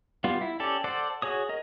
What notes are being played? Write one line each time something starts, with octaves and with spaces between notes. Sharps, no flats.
G3 B3 F4
E4
C#4 G4 A4 D5
A4 C5 D5 F#5
F#4 G#4 C#5 D#6
A#4 D#5